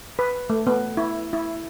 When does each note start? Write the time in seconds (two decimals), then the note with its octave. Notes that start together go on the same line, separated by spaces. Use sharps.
0.19 B4
0.50 A3
0.67 B3
0.97 E4
1.33 E4